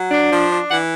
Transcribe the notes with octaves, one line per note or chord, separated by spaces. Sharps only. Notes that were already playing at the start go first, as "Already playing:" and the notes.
Already playing: F#3
D4
F3
D4
E3 F#5